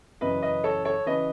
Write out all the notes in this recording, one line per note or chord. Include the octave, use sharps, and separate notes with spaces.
F#2 C#3 E3 B4 D#5
B4 D#5
A4 C#5
A4 C#5
C#3 E3 B4 D#5